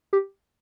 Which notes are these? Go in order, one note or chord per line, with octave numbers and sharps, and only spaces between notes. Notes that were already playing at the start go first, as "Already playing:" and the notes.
G4